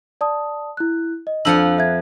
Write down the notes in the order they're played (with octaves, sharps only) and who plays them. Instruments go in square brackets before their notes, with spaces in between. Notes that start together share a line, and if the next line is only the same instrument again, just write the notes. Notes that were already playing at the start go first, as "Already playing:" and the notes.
[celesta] D5 A5 D#6
E4 F#6
D#5
[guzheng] F2 F3 F#5 [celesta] D4 E6 F#7
[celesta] E5 G#6